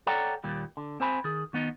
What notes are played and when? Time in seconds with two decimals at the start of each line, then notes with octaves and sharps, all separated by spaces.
0.07 A4 C#5 D5 F#5 G5 A#5
0.44 D#2 A#2 G3
0.77 D3
1.00 C4 C5 G#5 B5
1.24 D#3 G#4
1.53 D#3 B3 D#4